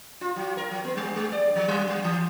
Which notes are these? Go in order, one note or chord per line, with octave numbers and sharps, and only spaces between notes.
F4
F#3
A#4
F#3
B3
G3
G3
D5
F3
F#3
G3
E3